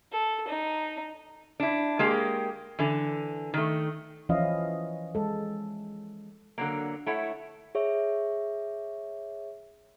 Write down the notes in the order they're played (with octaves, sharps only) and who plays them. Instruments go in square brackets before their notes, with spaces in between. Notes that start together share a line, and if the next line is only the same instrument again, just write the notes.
[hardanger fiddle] A4
D#4
[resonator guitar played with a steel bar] D4 E4
G#3 A#3 G4
D3 E3
D#3 A3
[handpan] E3 F3 C#4 E4 D#5 F5
G#3 A4
[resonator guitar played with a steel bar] D3 F#3 A#3
A3 E4 C#5 F#5
[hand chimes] G#4 C#5 E5 C#6